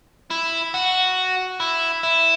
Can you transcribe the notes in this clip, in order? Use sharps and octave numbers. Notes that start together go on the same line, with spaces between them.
E4
F#4
E4
E4